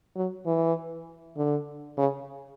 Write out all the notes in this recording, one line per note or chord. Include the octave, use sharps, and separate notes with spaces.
F#3
E3
D3
C#3